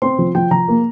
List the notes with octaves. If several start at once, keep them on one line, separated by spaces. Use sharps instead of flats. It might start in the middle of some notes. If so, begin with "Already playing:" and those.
C4 C6
F3
F3 G5
F3 A#5
A#3